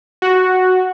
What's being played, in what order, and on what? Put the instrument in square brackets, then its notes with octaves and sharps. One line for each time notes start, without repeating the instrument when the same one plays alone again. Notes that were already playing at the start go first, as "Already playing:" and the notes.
[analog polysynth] F#4